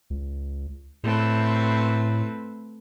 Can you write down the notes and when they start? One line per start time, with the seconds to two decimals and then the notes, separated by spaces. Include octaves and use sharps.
0.10 C#2
1.03 A2 A3 C4 B4